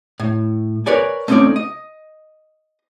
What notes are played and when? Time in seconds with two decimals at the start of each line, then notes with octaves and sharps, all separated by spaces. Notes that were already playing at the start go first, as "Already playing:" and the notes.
0.20 A2
0.86 A#4 B4 C#5 D5 G#5
1.28 A3 C4 C#4 D#4 C#5 D5
1.56 D#5